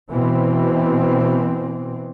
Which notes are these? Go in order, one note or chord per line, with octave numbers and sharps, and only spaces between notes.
B2 E3 C4